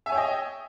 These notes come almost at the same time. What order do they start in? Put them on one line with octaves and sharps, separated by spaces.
E5 G#5 C#5 G5 D#5